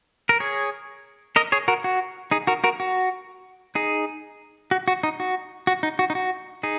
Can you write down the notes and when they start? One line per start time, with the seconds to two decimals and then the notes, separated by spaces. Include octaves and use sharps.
0.29 A#4
0.40 G#4 C#5
1.36 A#4 D#5
1.52 G#4 C#5
1.68 F#4 A#4
1.84 F#4
2.31 D#4 G#4
2.47 F#4 A#4
2.64 F#4 A#4
2.80 F#4
3.75 D#4 G#4
4.71 F#4
4.88 F#4
5.03 D#4
5.20 F#4
5.67 F#4
5.83 D#4
5.99 F#4
6.10 D#4
6.15 F#4
6.63 D#4 G#4